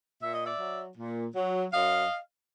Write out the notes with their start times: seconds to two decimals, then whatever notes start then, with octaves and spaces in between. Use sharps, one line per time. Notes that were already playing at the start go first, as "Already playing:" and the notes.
0.22 A#2 E5
0.34 D#5
0.46 D5 E5
0.60 F#3
0.97 A#2
1.35 F#3
1.73 F#2 D#5 F5